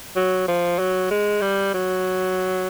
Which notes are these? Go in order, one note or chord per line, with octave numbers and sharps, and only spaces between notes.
F#3
F3
F#3
G#3
G3
F#3